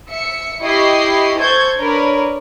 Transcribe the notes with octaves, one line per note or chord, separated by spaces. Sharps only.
E5 C#7
E4 G4 D#5 C#6 C7
A4 C5 C#6 G6 G#6
D4 A#4 B4 C#5